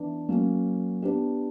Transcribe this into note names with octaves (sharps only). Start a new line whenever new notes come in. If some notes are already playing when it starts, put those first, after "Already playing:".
Already playing: E3 B3 D4
F#3 A#3 C#4
B3 D4 G4